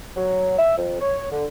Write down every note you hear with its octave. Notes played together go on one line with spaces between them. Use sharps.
F#3
E5
F2
C#5
D3